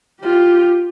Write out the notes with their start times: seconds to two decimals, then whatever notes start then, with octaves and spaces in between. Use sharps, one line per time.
0.21 F4 G4